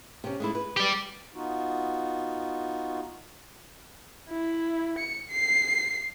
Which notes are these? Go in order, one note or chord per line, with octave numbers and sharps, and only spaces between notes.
C3 C#4
G#3 A3 E4
B4
G4 D5
B3 D#4 F4 F#4
E4
C#7
C7